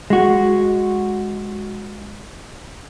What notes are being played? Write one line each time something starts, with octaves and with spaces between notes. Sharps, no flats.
G#3 F#4